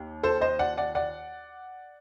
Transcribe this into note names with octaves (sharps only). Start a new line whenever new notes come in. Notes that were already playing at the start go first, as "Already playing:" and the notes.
Already playing: D#2
A4 C5
C5 D#5
D5 F#5
D5 F#5
D5 F#5